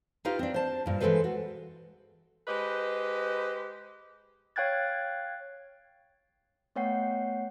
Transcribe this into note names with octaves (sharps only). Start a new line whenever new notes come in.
D#4 F4 G4 B4 F5
C4 D4
C5 A5
G2 A#2
E3 G#3 C4 A4 B4 C5
F#4
G#3 G4 B4 C5 D#5
C#5 F5 G5 F#6 G#6 A6
A3 B3 C#5 F#5 G5 C7